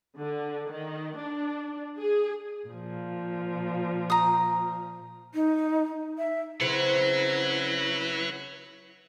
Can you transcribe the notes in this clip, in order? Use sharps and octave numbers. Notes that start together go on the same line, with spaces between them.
D3
D#3
D4
G#4
A#2 F3
A#5 D#6
D#4
E5
C#3 C4 E4 B4 C#5 F#5